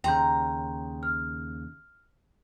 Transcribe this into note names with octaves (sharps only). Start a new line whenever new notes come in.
D#2 C#3 G5 A#5 C6 G6
F6